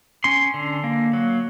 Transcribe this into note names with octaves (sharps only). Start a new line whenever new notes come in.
C#4 C6
D3
A#3
F#3